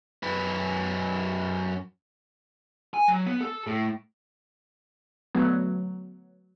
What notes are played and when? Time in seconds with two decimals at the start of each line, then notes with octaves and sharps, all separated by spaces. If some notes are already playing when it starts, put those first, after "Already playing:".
0.23 F#2 B4
2.94 G#5
3.08 F#3
3.26 B3
3.41 A4
3.67 A2
5.35 D3 F#3 A3 B3